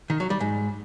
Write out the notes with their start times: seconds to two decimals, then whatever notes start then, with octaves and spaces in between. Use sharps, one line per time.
0.10 D#3
0.20 F#3
0.30 G3
0.40 G#2